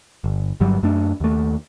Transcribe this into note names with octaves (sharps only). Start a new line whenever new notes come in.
G1
G1 G2 F#3 G3
F#2 A3 D4
D#2 A3